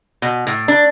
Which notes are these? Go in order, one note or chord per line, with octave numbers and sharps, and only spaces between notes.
B2
A2
D4